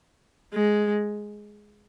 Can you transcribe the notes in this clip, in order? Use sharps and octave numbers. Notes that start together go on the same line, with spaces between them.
G#3